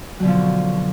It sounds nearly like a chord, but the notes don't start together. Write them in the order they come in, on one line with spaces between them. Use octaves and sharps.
F#3 D3 B2 F3